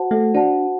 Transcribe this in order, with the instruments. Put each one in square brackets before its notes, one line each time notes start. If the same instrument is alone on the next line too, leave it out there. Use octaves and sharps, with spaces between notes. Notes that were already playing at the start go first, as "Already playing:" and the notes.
Already playing: [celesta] F#4 C5 F#5 A5
[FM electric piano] A3
[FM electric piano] D4 [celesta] F#4 C5 F#5 A5